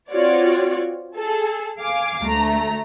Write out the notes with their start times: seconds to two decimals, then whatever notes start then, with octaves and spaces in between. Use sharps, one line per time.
0.11 C4 F4 F#4 C#5 D5
1.16 G#4 A4
1.79 F5 G#5 D6
2.21 D2 A3 A#5